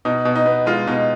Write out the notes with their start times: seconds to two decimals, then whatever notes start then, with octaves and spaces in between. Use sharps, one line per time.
0.05 B2 D#4
0.25 B2
0.36 D#4
0.46 B3
0.66 G#3 F4
0.87 B2 D#4